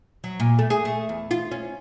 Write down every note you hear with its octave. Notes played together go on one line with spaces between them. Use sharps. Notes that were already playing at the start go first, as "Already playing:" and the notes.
F#3
A#2
A3
G#4
A3
E2
F4
C#4